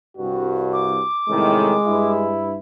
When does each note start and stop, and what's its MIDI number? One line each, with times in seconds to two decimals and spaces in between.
0.17 1.00 36
0.17 1.00 43
0.17 1.07 66
0.73 2.11 86
1.28 1.74 36
1.28 1.74 45
1.28 1.74 51
1.28 2.36 56
1.87 2.55 43
1.87 2.55 64